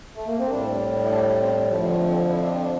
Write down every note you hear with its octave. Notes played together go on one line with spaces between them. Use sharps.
A3
A#3
C4
A2 G3 D4
E4
D4
C4
F2 D3 F3 A3
A3
C4
E4
D4
C4
D4